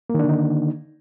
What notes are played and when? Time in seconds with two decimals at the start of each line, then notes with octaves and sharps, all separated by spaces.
0.10 A#3
0.14 D#3
0.19 D4
0.24 D3
0.29 D#4